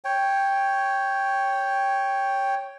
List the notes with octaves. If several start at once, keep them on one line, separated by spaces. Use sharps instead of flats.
C#5 G5